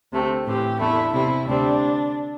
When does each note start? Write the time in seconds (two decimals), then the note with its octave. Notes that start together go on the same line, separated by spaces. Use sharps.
0.12 D2 C3 A3 C4
0.46 A2 E3 C4 G4
0.79 E2 D3 A3 E4
1.13 C3 G3 C4 E4
1.46 D2 C3 G3 C4 D4